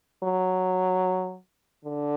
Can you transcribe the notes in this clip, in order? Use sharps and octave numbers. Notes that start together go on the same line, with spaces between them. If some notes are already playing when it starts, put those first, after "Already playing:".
F#3
D3